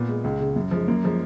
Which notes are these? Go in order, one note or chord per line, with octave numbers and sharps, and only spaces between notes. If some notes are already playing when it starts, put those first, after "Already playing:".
Already playing: A#2 B3
G#3
C#2 G#3
C#3 G#3
F#2
F3 G#3
F#2 A#3
F3 G#3